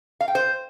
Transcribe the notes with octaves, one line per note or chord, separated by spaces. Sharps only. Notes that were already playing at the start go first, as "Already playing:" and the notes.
F5
G5
C5